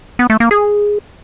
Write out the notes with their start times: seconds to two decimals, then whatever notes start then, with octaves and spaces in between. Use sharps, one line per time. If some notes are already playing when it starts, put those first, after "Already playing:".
0.19 B3
0.30 A3
0.40 A#3
0.51 G#4